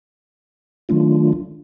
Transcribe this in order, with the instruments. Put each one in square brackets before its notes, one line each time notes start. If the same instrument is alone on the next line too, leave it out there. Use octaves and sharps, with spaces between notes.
[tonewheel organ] D#3 F#3 A3 D4 F4